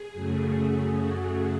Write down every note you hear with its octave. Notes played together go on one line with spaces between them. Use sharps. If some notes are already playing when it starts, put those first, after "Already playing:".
Already playing: G#4
F#2 C#3 F#3 A3
F#4